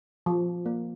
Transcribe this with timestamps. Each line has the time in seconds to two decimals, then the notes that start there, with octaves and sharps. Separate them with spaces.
0.26 F3
0.66 A#3